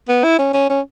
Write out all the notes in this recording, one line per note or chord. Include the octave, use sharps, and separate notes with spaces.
B3
E4
C#4
C#4
C#4